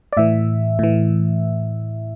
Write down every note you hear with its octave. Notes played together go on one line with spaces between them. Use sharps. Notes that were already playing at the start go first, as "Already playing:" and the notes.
D5
A2 E3 E5
A2 E3